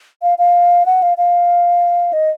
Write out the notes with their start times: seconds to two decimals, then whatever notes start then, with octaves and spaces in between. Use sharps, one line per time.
0.22 F5
0.38 F5
0.86 F#5
1.02 F5
1.18 F5
2.13 D#5